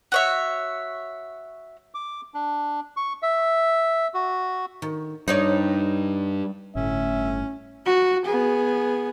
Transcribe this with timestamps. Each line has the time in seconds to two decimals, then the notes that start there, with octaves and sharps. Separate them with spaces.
0.12 F#4 C#5 E5
1.94 D6
2.34 D4
2.97 C#6
3.22 E5
4.14 F#4
4.82 D#3
5.28 G2 D#4 C#5 D5
6.75 G1 A2 C#4 E5
7.86 F#4
8.26 B3 G#4